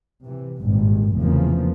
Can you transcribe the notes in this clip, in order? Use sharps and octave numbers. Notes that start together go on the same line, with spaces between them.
C3 E3
G#1 G2 A#2
F1 E2 C#3 E3 F3 A#3